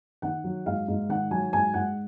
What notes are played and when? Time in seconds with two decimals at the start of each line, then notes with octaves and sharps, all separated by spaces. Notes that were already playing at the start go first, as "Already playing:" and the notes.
0.22 D#3 F#5
0.44 F#3
0.66 G#2 F5
0.88 G#2
1.09 D#3 F#5
1.31 F#3 G#5
1.53 G#2 G#5
1.74 G#2 F#5